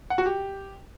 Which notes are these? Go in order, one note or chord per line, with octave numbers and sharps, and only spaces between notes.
F#5
F#4
G4